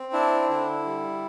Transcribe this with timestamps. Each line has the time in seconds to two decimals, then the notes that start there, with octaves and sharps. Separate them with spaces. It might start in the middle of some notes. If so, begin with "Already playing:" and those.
Already playing: C4
0.13 D4 E4
0.49 D3 E4
0.86 G3